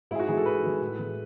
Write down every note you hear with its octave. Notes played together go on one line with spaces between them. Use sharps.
G#2 E4 G#4
F#4
E3 G#3 G#4
A4
G#2 B4
E3 G#3
A2
E3 G#3